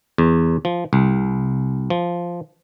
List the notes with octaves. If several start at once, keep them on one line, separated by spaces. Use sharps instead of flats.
E2
F3
C2
F3